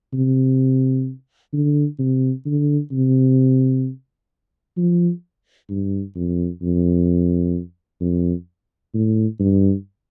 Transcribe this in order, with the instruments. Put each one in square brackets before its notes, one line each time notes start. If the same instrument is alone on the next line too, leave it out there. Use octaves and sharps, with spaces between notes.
[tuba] C3
D3
C3
D3
C3
F3
G2
F2
F2
F2
A2
G2